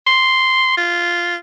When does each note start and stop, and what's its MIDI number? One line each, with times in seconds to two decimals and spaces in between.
0.07 0.77 84
0.77 1.36 65